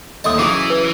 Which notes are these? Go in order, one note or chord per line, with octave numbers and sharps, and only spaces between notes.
D#2 A3 D#5 A5 C6 D#6
C#3 E3 F#3 D6
B4